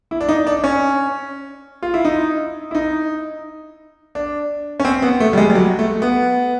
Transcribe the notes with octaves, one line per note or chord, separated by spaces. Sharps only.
E4
D4
D#4
D4
C#4
F4
E4
D#4
E4
D#4
D4
C#4
C4
B3
A3
G3
G#3
G3
F#3
A3
B3